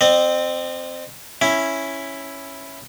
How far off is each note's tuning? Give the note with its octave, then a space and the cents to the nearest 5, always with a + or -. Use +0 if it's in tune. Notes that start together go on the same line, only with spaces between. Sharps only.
C4 -5 D#5 -40
C#4 -5 E4 +0